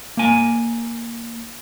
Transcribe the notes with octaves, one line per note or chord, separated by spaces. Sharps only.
A#3 G#5